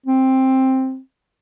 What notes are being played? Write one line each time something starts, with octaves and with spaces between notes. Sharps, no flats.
C4